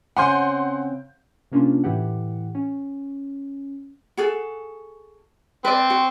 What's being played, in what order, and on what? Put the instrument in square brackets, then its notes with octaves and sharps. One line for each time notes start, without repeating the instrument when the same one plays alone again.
[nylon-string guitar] C#3 C4 G#5 [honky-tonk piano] F#5 C6 G6
[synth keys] C3 A#3 C#4 D4 F4
A2 E3 G4 F#5
C#4
[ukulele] F#4 G#4 A4
[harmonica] C4 [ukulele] B4 D5
[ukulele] F#4